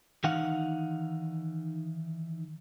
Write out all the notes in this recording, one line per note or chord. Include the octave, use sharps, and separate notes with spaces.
D#3 E3 D#4 F5 F#5